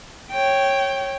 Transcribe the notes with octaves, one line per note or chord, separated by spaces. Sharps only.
C#5 G5